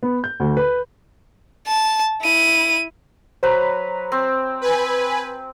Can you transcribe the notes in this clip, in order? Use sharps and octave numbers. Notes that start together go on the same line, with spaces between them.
B3
G6
D2
B4
A5
E4 D#7
F#3 B4 C5 A#5
C4
B4 G#5